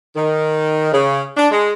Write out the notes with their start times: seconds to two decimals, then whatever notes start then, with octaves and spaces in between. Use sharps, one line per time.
0.16 D#3
0.92 C#3
1.37 D4
1.51 G#3